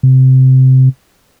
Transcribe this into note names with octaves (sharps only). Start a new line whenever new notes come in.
C3